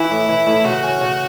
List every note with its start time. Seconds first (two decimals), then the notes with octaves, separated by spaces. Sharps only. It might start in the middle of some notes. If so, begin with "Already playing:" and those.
Already playing: E3 E4
0.11 A2
0.29 E3
0.47 A2
0.65 C#3 F#4
0.83 C#4
1.01 C#3